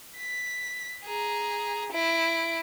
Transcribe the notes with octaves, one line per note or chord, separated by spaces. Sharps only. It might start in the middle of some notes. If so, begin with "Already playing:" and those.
B6
G#4 A#5
E4 D7